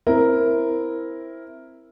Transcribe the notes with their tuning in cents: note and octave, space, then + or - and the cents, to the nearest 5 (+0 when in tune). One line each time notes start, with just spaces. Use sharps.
C4 +0 E4 +0 A#4 +5